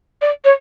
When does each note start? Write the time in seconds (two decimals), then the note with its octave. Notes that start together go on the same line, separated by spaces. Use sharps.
0.22 D5
0.45 C#5